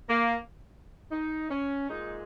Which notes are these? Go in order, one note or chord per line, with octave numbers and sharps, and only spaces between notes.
A#3
D#4
C#4
A#2 G#3 D#4